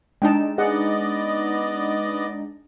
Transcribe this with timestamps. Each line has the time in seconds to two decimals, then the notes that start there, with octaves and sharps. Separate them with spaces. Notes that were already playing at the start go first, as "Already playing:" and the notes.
0.22 G#3 D4 D#4 G5 A5
0.58 B3 G#4 D5 D#5 F#5